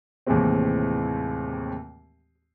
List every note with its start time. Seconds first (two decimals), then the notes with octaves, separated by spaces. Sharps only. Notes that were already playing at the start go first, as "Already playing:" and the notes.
0.27 D#2 A2 C3 E3 G#3 C4